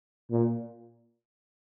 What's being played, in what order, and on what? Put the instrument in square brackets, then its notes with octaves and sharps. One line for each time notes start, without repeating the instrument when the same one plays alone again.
[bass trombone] A#2